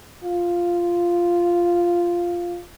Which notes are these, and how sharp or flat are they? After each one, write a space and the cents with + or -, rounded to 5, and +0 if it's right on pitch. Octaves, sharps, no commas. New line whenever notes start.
F4 -5